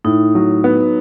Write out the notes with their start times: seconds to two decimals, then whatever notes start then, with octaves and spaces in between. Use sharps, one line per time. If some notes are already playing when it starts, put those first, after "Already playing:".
0.04 A2 D#4
0.35 F#3
0.64 B3